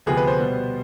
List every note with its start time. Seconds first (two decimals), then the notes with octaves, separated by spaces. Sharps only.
0.06 D2 C3 F3 B3 G#4
0.17 B4
0.27 C5
0.38 B2 G3 B3